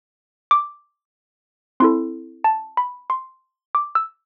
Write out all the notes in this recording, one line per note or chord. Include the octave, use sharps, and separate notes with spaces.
D6
C4 E4 A4 C6
A5
B5
C6
D6
E6